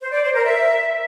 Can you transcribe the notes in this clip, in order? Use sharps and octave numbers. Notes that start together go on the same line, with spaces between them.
C5
D5
C5
A#4
E5